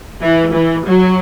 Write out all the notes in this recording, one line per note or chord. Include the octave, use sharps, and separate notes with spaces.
E3
E3
F#3